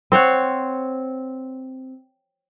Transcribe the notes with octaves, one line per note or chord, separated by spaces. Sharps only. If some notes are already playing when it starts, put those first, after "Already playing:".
C4 C5 C#5 F#5